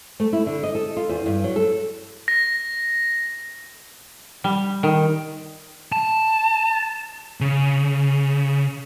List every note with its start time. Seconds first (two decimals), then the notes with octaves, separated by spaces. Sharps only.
0.20 A3
0.33 E4
0.46 D3
0.63 D#5
0.75 A4
0.97 F4
1.09 E2
1.26 G2
1.44 F#3
1.56 A4
2.28 A#6
4.44 G3
4.83 D#3
5.92 A5
7.41 C#3